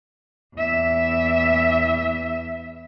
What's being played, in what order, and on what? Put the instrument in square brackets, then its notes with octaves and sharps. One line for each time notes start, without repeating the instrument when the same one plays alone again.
[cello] E2 E5